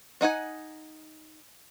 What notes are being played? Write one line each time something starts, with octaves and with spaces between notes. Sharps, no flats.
D4 D#4 F#5 G#5